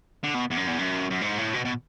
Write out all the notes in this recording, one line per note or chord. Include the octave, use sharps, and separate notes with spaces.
D3
B2
E2
F#2
E2
F#2
F#2
G#2
A2
B2
B2